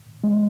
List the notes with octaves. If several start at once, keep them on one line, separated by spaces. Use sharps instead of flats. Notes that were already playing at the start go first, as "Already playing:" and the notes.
G#3